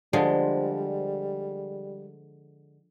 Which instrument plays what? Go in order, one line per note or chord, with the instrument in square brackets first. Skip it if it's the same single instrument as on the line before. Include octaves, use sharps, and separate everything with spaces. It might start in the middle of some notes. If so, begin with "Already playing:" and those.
[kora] D3 G#3 [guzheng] F3 [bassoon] G3